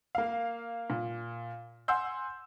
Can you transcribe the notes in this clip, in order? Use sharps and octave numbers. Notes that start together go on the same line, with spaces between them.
A#3 F5
A#2
F#5 G#5 C6 E6 G6